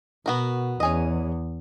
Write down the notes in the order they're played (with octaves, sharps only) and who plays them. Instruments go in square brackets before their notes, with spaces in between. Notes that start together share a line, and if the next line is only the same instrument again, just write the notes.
[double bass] B2 [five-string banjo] B3 F#4 A#4
[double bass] E2 [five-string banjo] C#4 G#4 D#5